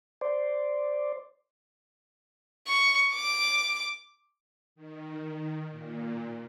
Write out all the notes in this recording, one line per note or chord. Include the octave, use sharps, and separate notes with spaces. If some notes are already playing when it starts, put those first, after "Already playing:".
C5 D5
C#6
D6
D#3
A#2